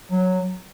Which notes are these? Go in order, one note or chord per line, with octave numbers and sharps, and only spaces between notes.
F#3